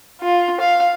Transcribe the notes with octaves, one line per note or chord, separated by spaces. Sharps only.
F4
F5